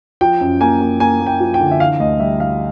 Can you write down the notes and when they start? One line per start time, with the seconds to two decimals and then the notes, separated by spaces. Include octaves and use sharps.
0.21 F3 G5
0.41 F#2
0.61 A#3 G#5
0.81 A#3
1.00 A#3 G#5
1.20 A#3
1.26 G5
1.40 F3
1.54 G5
1.60 D3
1.71 E5
1.80 E3 F5
2.00 D2 D#5
2.20 G3 E5
2.40 G3 F5